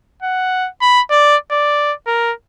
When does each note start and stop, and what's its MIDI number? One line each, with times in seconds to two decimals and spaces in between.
0.23 0.69 78
0.82 1.01 83
1.11 1.36 74
1.52 1.93 74
2.07 2.32 70